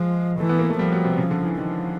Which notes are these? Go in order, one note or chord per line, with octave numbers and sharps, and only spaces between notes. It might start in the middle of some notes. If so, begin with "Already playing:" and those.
Already playing: F3 G#3
E3 A3
B3
A#3
A3
F3 G3
F#3
C3
C#3
D3
E3
D#3 F3